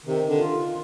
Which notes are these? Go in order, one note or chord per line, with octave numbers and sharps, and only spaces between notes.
C3 D#3
D3
F4